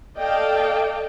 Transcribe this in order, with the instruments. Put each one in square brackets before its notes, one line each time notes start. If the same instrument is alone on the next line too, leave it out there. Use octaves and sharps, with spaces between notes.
[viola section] A4 D5 D#5 F5 G5 A5